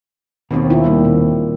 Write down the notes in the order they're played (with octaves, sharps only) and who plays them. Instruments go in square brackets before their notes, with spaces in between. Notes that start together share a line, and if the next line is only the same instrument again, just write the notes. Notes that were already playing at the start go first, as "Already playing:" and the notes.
[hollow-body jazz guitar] D#2 B2 [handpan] D#3 C4
[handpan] E4 F4
D#3 G3 A#3
A#2